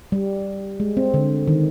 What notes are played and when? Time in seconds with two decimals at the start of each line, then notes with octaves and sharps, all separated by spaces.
0.12 G3
0.80 G#3
0.97 C4
1.14 D3
1.48 D#3